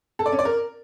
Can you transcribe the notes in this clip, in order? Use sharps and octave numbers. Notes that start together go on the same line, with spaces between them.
A4
D5
C#4
D5
A#4